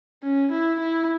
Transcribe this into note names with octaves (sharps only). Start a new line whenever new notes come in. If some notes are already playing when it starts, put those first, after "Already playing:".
C#4
E4
E4